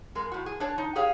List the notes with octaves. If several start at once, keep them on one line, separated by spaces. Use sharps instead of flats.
F2 G#3 A#4
A2 F#4
G#4
D4 C#5 A5
D#4
G4 G#4 C#5 F5